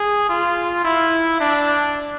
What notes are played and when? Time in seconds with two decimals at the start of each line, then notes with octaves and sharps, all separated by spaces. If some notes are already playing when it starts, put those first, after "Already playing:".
Already playing: G#4
0.29 F4
0.84 E4
1.40 D4